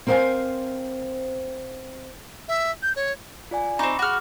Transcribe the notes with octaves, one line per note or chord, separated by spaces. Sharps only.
C4 A#4 C5 D#5 F5 G#5
E5
G6
C#5
F4 D5 G#5
C4 D#4 B5 C#6 D6
F#4 G#4 D6 F6